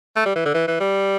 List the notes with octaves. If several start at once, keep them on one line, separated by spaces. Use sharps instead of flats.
A3
G3
E3
D3
E3
E3
G3